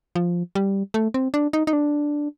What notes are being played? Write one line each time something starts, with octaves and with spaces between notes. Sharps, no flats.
F3
G3
A3
C4
D4
D#4
D#4
D4